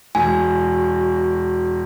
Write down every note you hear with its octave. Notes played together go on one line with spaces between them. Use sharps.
E1 F#4 G#5